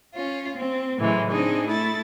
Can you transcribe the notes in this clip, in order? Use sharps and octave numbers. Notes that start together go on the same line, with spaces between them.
C#4 F4
C4
A2 C#3 E3 F#3 G#3
C4 D4 D#4 G#4
A3 E4 A6